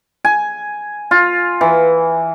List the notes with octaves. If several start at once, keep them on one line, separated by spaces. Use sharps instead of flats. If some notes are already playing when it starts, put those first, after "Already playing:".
G#5
F4
E3